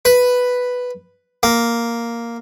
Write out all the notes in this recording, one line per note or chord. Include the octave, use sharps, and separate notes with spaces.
B4
A#3